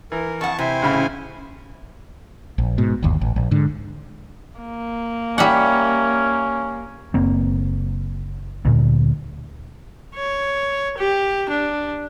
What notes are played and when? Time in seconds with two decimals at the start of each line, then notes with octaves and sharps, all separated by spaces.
0.12 E3 A#4
0.41 F2 F#5 A5 C#6
0.58 C3 E4 C5 G#5
0.82 A1 C#3 B5
2.58 A#1
2.78 G#2 B2
3.03 G1 D#2
3.21 A1
3.36 A#1
3.51 G#2 D3
4.60 A#3
5.38 G3 C#4 E5 F#5
7.14 F#1 A#3 C4
8.65 D2 A#2
10.15 C#5
10.98 G4
11.50 D4